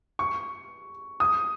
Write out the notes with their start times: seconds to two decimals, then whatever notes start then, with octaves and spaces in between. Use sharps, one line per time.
0.19 C#6
1.20 D#6